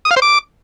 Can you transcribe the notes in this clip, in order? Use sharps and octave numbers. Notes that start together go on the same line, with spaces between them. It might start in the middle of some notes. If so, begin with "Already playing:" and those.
D#6
F5
C5
D6